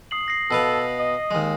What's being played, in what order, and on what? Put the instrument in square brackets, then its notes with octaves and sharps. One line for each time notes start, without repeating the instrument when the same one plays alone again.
[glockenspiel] D#6 C7 F#7
A#6 C7
[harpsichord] B2 B4 F5 [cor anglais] A4
[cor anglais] D#5
[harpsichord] D#2 G#3